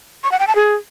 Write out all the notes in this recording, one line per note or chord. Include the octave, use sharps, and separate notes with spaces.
C#6
F#5
G5
A5
G#4